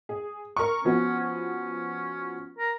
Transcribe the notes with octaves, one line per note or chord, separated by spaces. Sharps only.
G#4
A#4 C#6
F3 B3 C#4 F#4
C#4
A#4